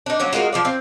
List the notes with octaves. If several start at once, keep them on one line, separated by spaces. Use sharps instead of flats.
D4 D#4
F#3 A#3 C#4
G#3 F4 F#4 A#4
F3 F4 D5
C4